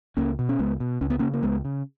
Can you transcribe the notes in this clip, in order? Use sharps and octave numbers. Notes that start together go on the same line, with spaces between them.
C#2 A#3 C#4
B2
C#4
C#2 G#3 B3
B2
C#2 C#4
B3
C#3 A#3 C#4
A#3
C#2 G#3 B3
C#3